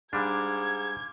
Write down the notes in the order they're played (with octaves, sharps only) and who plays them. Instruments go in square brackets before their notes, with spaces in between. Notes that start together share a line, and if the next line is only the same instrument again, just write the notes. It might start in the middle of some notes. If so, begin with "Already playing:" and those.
[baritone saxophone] G#2 [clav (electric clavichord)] G3 D4 [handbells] F5 D6 F6 [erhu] G#6